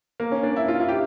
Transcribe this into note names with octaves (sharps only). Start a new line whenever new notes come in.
A#3
C#4
D4
E4
F4
F4
G4